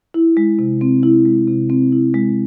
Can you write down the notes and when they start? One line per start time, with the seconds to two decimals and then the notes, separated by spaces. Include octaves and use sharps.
0.14 E4
0.37 G#3
0.59 C3
0.81 C4
1.03 E4
1.26 G#3
1.47 C3
1.70 C4
1.92 E4
2.14 G#3